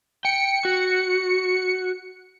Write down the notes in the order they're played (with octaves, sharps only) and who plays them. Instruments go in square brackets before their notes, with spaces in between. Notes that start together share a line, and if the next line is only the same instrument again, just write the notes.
[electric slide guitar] G5 [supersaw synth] C#7
[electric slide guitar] F#4